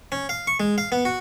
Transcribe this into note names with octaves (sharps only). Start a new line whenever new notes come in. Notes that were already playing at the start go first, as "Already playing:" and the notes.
C#4
F5
C#6
G#3
F5
B3
F#4